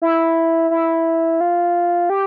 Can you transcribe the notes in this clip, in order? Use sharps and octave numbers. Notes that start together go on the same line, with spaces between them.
E4
E4
F4
G4